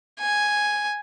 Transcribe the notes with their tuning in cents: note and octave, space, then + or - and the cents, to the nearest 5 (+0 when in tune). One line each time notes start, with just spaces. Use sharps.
G#5 +0